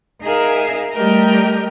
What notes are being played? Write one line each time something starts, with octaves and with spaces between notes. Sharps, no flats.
D#4 G#4 A#4 E5 F5
G3 A3 G4 A#4 D#5